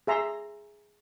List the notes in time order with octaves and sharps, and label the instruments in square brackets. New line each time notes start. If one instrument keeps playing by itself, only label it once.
[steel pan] G#4 E5 A#5 C6